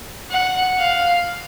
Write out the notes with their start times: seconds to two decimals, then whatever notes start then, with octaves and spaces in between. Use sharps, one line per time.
0.31 F#5
0.79 F5